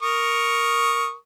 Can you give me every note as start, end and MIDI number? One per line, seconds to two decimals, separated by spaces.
0.02 1.14 70
0.02 1.14 85
0.02 1.14 87